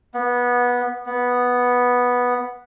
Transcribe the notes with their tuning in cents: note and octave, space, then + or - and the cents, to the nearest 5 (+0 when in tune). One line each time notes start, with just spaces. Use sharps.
B3 -15
B3 -5